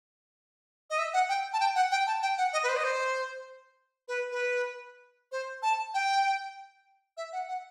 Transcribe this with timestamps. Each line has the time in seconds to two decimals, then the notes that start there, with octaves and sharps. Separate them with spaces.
0.90 D#5
0.98 E5
1.14 F#5
1.29 G5
1.53 A5
1.60 G5
1.76 F#5
1.91 G5
2.07 A5
2.22 G5
2.38 F#5
2.53 D#5
2.63 B4
2.69 C5
2.77 D#5
2.84 C5
4.08 B4
4.32 B4
5.32 C5
5.63 A5
5.94 G5
7.17 E5
7.33 F#5
7.48 F#5